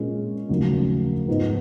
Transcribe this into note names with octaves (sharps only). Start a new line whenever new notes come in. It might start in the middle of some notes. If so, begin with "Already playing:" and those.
Already playing: A#2 G#3 C#4
F1 D#2 C#3 F#3
G#2 F3 B3 D#4